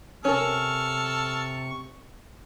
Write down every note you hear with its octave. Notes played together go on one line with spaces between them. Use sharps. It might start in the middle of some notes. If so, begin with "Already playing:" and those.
C3 C#4 A4 A#4 C#6 F6